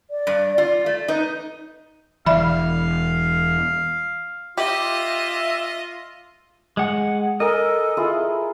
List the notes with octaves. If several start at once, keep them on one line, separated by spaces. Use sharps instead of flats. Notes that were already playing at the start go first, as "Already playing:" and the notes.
D5
G2
F4
A3
D#4 B4
E1 E3 D5 E5 F5 B5
F4 G4 D#5 E5
G#3 F#5
A4 A#4 D#5 G#5
E4 F4 G#4